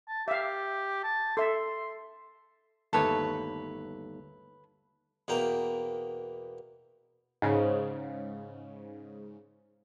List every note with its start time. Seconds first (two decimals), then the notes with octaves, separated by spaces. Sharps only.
0.08 A5
0.28 G4 E5 F5
1.03 A5
1.37 A4 E5 C6
2.93 G1 D#2 A3 A4 B4 C#5
5.28 E2 B2 A#3 G5 A#5
7.42 G#2 C#3